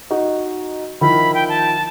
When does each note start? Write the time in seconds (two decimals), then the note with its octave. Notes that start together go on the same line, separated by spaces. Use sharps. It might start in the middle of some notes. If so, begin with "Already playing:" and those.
0.11 D#4 F#4
1.01 D#3 F3 E4 B5
1.34 G5
1.49 A5